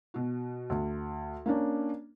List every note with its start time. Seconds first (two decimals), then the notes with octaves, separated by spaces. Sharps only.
0.14 B2 F#4
0.70 D2
1.46 A#3 C#4 D4